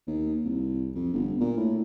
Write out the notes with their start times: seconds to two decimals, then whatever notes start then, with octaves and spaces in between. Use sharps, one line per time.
0.07 D#2
0.45 C2
0.95 F2
1.13 G1
1.40 A#2
1.57 A2